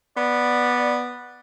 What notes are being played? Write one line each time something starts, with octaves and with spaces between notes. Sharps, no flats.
B3 D5